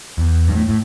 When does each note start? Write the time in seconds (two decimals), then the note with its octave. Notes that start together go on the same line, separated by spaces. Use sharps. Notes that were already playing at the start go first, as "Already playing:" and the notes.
0.18 E2
0.48 G2
0.55 A2
0.69 A2